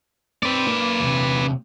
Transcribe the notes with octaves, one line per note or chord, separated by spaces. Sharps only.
C4 B4 D5
A#3
E2 C3